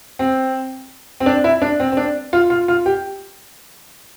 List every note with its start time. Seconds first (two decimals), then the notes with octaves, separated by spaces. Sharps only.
0.19 C4
1.20 C4
1.26 D4
1.44 E4
1.62 D4
1.80 C4
1.92 C4
1.97 D4
2.33 F4
2.50 F4
2.68 F4
2.86 G4